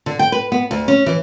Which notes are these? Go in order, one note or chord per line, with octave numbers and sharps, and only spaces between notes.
D3
G5
B4
B3
D2
C#4
E3